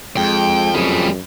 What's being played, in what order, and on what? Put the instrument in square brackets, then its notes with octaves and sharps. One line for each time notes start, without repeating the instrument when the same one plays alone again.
[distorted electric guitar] F2 [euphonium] G#3 [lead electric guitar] G5
[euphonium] F#2 [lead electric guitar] G3 G#4